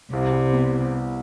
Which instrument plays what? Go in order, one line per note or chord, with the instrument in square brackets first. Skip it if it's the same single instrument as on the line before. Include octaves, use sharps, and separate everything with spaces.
[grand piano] C2 [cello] C3
[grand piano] G3
B3